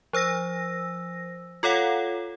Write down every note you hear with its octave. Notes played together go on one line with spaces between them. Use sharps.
F3 C5 E6 A#6
F4 A4 C#5 F5 F#5